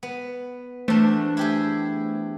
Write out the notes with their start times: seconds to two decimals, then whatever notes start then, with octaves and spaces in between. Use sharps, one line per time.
0.03 B3
0.88 E2 A3 D4 C5
1.37 E4 G4 G#4